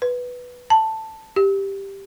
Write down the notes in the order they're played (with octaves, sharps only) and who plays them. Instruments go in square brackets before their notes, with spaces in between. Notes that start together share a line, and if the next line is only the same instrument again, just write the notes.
[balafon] B4
A5
G4